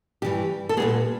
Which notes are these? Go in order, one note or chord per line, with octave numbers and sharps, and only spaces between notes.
G2 E3 G3 G4
A4
A#2 G3 B3 G#4